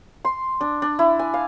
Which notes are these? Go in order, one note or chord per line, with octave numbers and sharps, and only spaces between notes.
C6
D4
D4
E4
G#5
F5